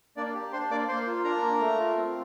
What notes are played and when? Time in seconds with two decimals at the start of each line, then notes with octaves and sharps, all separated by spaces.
0.17 A#3 D4 D5
0.34 G4
0.53 D4 C5 C6
0.70 A#3 D5 D6
0.88 A#3 C5 C6
1.07 F4
1.24 D4 A#4 A#5
1.42 A#3
1.60 A3
1.78 F4
1.96 C4